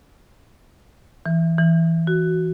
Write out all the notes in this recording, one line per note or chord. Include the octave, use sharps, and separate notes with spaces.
E3
E3
F#4